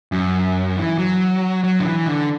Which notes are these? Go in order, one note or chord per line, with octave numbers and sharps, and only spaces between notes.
F#2
E3
F#3
F#3
D3
E3
D3